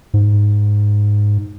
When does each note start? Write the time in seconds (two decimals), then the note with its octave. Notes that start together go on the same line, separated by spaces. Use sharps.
0.14 G#2